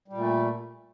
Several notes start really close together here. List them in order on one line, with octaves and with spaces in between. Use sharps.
G3 A#2 A3